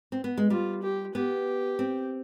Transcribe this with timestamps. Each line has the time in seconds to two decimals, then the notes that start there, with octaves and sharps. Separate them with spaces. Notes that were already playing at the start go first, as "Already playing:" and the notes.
0.12 C4
0.24 B3
0.37 G#3
0.50 G3 F4
0.82 G4
1.15 B3 G4
1.79 C4